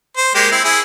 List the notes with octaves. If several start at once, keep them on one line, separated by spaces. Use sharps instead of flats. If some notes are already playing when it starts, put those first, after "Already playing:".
C5
G#3 A#3 G4
C4 E4
E4 G#4